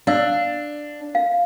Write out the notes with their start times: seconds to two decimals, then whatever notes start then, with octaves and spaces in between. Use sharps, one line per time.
0.07 D4 D5 F5 E6
1.15 F5